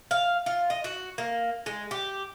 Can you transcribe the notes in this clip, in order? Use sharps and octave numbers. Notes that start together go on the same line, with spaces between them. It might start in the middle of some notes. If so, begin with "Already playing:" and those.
F5
F4
D#5
F#4
A#3
G#3
G4